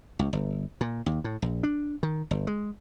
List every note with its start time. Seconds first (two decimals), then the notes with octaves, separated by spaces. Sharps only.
0.19 C#2
0.33 G1
0.81 A#2
1.06 D#2
1.24 A2
1.42 A#1
1.63 D4
2.03 D#3
2.31 G1
2.47 G#3